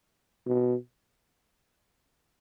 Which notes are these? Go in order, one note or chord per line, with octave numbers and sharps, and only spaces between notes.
B2